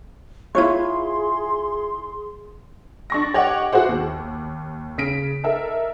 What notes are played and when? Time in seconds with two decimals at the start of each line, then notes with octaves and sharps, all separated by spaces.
0.55 E4 F4 G#4 C#5 C6
3.10 D4 C#6 A#6
3.34 G4 C#5 D#5 F#5 G5 D6
3.73 E4 F#4 G#4 C5 F#5
3.89 D#2
4.98 C#3 B6 D7
5.43 D#4 A4 A#4 E5